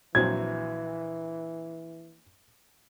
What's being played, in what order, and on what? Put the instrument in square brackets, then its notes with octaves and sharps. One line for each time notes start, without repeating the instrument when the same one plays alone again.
[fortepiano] A#1 F#3 C4 [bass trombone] E3 [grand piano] G#6